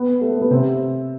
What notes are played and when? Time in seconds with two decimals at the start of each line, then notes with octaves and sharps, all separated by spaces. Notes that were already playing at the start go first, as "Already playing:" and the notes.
Already playing: B3
0.21 A3
0.32 A3
0.42 B3
0.50 C3 C4